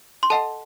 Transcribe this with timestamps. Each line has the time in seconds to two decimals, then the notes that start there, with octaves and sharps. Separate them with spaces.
0.23 C6
0.30 A4 D#5 F#5 A5